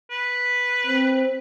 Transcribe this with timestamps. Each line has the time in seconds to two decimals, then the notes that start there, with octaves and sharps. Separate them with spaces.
0.11 B4
0.87 C4